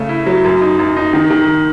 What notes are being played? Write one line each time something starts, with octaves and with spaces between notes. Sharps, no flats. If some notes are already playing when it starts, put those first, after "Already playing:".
Already playing: C#3 A3
E4
F#3
F#2
D#4
F#2
D#4
D#3
D#3